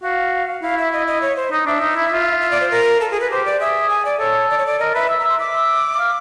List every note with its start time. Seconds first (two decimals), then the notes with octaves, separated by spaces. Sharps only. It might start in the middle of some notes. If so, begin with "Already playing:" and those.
0.03 F#4 F5
0.62 E4 F5
0.78 E5
0.93 D#5
1.07 D#5
1.22 C#5
1.36 C5
1.51 D#4 D#5
1.66 D4 E5
1.81 D#4
1.96 E4
2.12 F4
2.41 E5
2.51 D5
2.61 C5
2.71 A#4
3.01 A4
3.11 G#4
3.21 B4
3.31 G4 C5
3.46 D5
3.60 G#4 E5
3.90 G#5
4.05 D5
4.20 A4 C#5
4.50 D5
4.58 C#5
4.66 D5
4.79 A#4 D#5
4.95 B4 E5
5.09 E5
5.20 A#5
5.24 E5
5.29 C6
5.39 E5 D6
5.99 F5